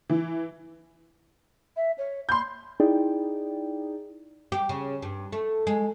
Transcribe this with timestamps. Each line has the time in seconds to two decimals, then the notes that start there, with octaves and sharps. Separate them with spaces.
0.10 E3
1.76 E5
1.98 C#5
2.29 B5 C6 G6
2.80 D#4 E4 G#4 D5 G5
4.52 G4
4.69 C#3
5.02 G2
5.32 A3
5.67 G#3